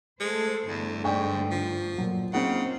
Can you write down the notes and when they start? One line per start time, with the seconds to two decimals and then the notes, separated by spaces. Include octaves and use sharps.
0.20 G#3 A3 A4 C5
0.68 E2 G2 D3 A3
1.04 G#2 D5 G5 C#6
1.51 F3
1.98 A#2 F#3
2.33 C#3 A#3 C4 D#4 F4 C5 F#5